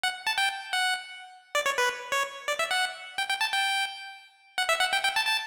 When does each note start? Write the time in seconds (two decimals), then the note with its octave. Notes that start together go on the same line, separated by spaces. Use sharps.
0.03 F#5
0.27 A5
0.38 G5
0.73 F#5
1.55 D5
1.66 C#5
1.78 B4
2.12 C#5
2.48 D5
2.59 E5
2.71 F#5
3.18 G5
3.29 G5
3.41 A5
3.53 G5
4.58 F#5
4.69 E5
4.80 F#5
4.93 G5
5.03 G5
5.16 A5
5.27 A5